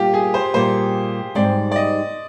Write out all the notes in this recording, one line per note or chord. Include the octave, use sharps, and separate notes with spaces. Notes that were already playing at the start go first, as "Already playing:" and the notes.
Already playing: A#2 G3 A#3 F4 G4
G#4
C5
A#2 G3 A#3 C5
G#2 G3 C4 D#4 D5
D5
D#5